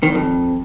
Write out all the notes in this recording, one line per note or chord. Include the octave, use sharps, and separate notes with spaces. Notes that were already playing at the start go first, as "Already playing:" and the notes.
D#3
E2
F2